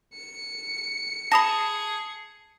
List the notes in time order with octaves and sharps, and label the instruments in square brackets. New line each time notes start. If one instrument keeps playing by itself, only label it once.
[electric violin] C#7
[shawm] G#4 [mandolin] A5 D#6 [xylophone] B5 A#6